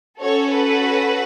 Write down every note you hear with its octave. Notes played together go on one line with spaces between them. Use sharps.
C#4 F#4 A4 C#5
B4